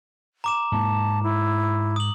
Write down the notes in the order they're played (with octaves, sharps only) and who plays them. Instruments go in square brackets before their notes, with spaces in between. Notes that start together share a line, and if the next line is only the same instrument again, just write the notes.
[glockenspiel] A#5 D6 E7
[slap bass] G#2 A#3 [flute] A5
[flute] E4
[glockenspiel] D#6 F#7